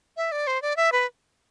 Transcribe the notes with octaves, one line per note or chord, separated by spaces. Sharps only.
E5
D5
C5
D5
E5
B4